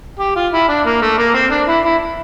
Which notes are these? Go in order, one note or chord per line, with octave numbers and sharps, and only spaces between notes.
G4
F4
E4
D4
A#3
A3
A#3
C4
D4
E4
E4